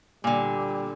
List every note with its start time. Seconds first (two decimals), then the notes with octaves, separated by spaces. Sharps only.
0.24 A#2 D3 G3